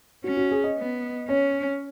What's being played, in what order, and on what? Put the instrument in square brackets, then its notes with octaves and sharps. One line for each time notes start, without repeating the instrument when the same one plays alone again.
[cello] C#4 [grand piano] F#4
[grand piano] F#4
G#4
D#5
[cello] B3
[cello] C#4 [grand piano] C#5